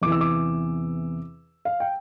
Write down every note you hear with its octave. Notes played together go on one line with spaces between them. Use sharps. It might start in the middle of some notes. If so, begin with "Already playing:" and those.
E2 C3 E3 D6
E6
D6
F5
G5